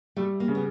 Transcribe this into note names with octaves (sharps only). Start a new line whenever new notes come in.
G3 A3
A#3
C#3
B3